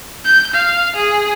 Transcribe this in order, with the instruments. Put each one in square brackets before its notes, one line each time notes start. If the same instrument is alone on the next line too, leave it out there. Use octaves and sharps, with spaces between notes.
[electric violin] G6
F5
G#4